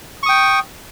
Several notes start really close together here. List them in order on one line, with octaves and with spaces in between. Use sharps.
C#6 D#6 G5